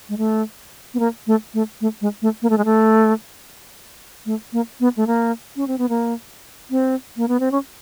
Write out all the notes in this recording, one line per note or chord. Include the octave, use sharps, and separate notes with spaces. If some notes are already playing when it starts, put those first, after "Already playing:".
G#3
A3
B3
A#3
A3
A3
A3
G#3
A3
A#3
A3
G#3
A3
A3
A#3
B3
A3
A#3
C#4
C4
B3
A#3
C4
A#3
B3
C4
C#4